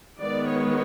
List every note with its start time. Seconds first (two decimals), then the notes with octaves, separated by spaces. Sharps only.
0.20 D#3 G#3 B3 D5
0.54 C#5